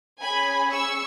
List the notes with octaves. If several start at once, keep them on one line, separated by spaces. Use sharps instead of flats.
C#4 G#4 G#5 B5
C#6 E6